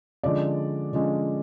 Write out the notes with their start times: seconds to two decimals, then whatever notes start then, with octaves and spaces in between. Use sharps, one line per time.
0.23 D3 F3 G#3 C#4 D5
0.93 D3 F3 G#3 C#4